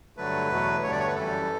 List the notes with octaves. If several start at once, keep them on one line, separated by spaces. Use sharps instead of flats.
G2 D3 F#3 A3 B4
E2 B2 F#3 A3
G2 D3 A3 C#5
D5
C#5
B4
F#2 E3 G3 A4